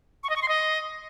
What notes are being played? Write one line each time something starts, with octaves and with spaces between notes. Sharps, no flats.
C#6
D#5
C#6
C6
D#5